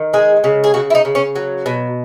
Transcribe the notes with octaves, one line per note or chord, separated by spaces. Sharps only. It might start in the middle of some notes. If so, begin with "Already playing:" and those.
Already playing: D#3
G#3 G#4
C#3
G#4
C#3 F#4
E4
D#4
C#3
C#4
F#3
B2